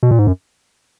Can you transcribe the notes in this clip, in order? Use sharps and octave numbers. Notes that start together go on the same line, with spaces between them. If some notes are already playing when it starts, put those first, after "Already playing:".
B2
A#2
G#2
F#2